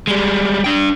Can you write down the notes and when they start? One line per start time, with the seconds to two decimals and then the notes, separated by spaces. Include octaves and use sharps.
0.07 G3 G#3
0.64 D4 G5